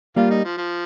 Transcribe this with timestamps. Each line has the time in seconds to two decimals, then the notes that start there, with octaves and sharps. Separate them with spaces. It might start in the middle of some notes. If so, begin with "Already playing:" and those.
0.16 G3 A#3 F4
0.31 D#4
0.44 F3
0.57 F3